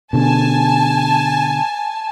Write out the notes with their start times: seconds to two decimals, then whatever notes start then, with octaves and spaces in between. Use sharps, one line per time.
0.13 B2 D3 G#5 A5